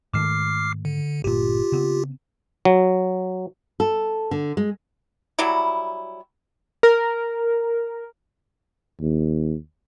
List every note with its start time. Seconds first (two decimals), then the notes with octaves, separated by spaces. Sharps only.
0.14 G#2 D#3 A3 D6 F6 C7
0.85 D3
1.24 G1 A#2 F4 G4
1.72 C#3 B3 C4
2.65 F#3
3.80 A4
4.31 D3
4.57 G#3
5.39 F#3 G3 E4
6.83 A#4
9.00 D#2